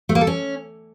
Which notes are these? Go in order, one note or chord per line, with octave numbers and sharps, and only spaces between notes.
A3
A#3
A4
C#4